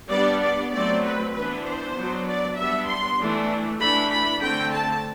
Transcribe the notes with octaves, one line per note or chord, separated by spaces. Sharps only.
G3 B3 D4 D5
D5
F#3 A3 C4 D5
B4
E3 B3 D4 B4
C5
F#3 B3 D4
D5
G3 B3 D4 E5
C6
E3 A3 D4
E3 A3 D4 B5
B5
D3 A3 C4 G5
A5